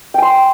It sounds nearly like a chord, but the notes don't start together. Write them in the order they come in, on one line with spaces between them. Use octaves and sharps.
G5 G#5 C6